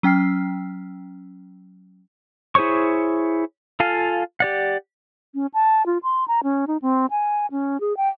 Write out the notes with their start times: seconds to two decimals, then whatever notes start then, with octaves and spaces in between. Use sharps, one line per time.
0.03 F#3 C#4 G5 F6 C7
2.55 E4 G#4 C5 C#5 C#6
3.80 F4 A4 F5 G#5
4.40 G4 D5 F#5
5.35 C#4
5.54 A5
5.86 F4
6.03 C6
6.28 A#5
6.44 C#4
6.67 D#4
6.82 C4
7.11 G#5
7.51 C#4
7.80 G#4
7.97 G5